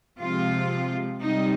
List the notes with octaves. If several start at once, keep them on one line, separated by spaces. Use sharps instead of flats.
C3 F3 G#3 F4
C3 G3 D#4